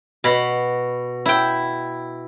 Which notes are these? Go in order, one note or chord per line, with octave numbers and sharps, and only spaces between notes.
B2 B5
E4 G5